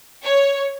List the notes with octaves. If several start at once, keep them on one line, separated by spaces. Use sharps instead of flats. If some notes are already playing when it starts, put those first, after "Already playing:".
C#5